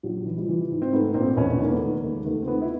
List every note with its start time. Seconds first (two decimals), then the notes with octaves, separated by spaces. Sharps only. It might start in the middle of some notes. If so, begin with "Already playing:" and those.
0.03 A#1 F#3
0.26 E3
0.37 F3 G3
0.49 E3
0.71 G#2
0.82 C4
0.93 G#2 A3 B3
1.14 A#1 A#3 C4
1.36 E1 B3 C#4
1.59 D#3
1.65 A#3
1.70 A3 B3
1.81 D#3
2.03 D#2 G#3 A#3
2.25 D#2 A3 B3
2.42 C4
2.47 D#3 A3 B3
2.62 E4